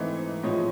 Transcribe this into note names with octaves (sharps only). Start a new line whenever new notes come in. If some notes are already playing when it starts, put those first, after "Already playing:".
Already playing: G#2 E3 A3 C4 D#4
A2 F3 G#3 C#5 D#5